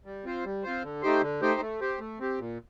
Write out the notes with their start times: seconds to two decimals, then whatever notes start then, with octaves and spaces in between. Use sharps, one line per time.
0.05 G3
0.25 C4 F4 C5
0.44 G3
0.63 C4 F4 C5
0.83 D3
1.02 A3 D#4 G4 C5
1.21 D3
1.41 A3 D#4 G4 C5
1.60 A3
1.80 C4 G4
1.99 A3
2.20 C4 G4
2.39 A#2